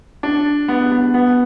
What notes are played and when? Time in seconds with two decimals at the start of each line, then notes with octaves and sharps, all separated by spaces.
0.23 D4
0.68 B3
0.91 B3
1.14 B3